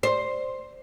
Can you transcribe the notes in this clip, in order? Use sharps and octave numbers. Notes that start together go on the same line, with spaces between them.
C5